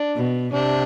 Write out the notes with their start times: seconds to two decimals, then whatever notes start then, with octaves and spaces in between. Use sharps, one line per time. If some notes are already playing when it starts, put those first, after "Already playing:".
Already playing: D4
0.15 B2
0.53 C3 D4